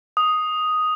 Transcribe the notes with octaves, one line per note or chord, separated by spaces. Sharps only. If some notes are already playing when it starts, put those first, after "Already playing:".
D#6